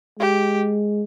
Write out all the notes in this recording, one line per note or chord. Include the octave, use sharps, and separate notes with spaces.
G#3 G4